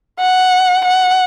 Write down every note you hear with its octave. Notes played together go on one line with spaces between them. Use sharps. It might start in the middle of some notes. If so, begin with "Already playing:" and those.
F#5
F#5